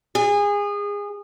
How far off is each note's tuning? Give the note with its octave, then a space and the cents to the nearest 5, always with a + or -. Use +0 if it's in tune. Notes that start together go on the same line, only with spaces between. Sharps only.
G#4 -25